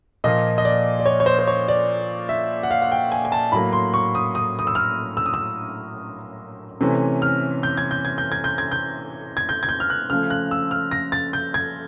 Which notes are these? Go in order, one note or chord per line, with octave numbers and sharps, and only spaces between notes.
A#2 F3 A#3 D#5
D#5
D5
D5
C#5
C#5
C5
C5
C#5
D5
E5
F#5
F5
F#5
G5
G#5
G#5
A5
A2 F#3 A#3 B5
C6
C#6
D#6
D#6
D#6
E6
F6
E6
D#6
E6
C3 E3 A3 C#4
F6
G6
G#6
G6
G#6
G6
G#6
G6
G#6
G6
G#6
G6
G#6
G6
F6
F#6
C#3 F3 A3 F6
F#6
E6
F6
A#6
A6
G6
G#6